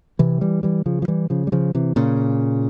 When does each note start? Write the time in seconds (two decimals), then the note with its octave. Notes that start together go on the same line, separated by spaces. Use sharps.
0.19 C3 E3
0.41 E3 G3
0.63 E3 G3
0.86 C#3 F3
1.02 F3
1.08 E3 G3
1.30 C#3 F3
1.47 G3
1.52 C#3 F3
1.75 C3 E3
1.96 A#2 C#3